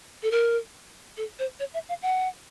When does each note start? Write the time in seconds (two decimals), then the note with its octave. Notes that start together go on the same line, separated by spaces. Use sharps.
0.23 A4
0.31 A#4
1.17 A4
1.39 C5
1.60 C#5
1.74 E5
1.89 F5
2.02 F#5